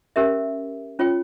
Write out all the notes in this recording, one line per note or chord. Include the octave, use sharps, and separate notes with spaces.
C#4 G4 A#4 E5
C#4 F4 C#5 G5